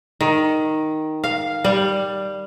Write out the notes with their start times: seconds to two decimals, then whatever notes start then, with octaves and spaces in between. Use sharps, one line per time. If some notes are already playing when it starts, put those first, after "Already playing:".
0.21 D#3
1.24 F5
1.64 G3